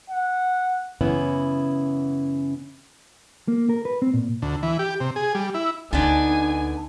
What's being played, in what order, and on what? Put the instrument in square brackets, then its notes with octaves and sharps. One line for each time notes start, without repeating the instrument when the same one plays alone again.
[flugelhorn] F#5
[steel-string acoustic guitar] F#2 C#3 E3 B3 C#4 E4
[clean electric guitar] A#3
A#4
B4
C4
A#2
[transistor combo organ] D2
E3
G4
C3
G#4
G3
E4
[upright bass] D2 [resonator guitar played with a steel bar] D3 B3 D4 [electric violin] D#4 G#5